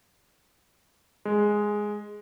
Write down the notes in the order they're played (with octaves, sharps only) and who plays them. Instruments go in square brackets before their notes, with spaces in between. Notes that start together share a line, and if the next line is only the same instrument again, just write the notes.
[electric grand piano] G#3